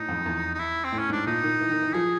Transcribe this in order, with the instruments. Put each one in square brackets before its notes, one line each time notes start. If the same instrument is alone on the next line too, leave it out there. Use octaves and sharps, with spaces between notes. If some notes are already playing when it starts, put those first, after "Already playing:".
Already playing: [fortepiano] A2 [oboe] D#4
[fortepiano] F2
E2
[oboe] D#4
E4
C4
[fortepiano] A2
[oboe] C#4
[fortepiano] G#2 [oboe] D4
[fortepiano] A#2 [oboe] D#4
[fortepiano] D#3
E3
D#3
E3
[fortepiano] F3 [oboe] G#4